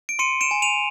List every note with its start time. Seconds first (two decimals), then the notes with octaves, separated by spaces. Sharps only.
0.09 D7
0.19 C6 C#7 D#7
0.41 D7 E7
0.51 G#5
0.62 D#7 F7